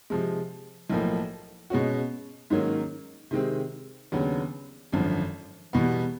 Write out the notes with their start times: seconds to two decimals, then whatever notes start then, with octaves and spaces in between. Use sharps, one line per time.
0.10 C3 F3 G#3
0.90 B1 A2 F3 A#3
1.70 B2 G#3 C#4 F#4
2.50 G#2 D#3 F#3 A#3 C#4
3.31 C3 D#3 G#3 C4
4.12 D#2 C#3 F#3 B3 D4
4.92 G#1 F#2 D3 F3
5.73 E2 B2 G3 B3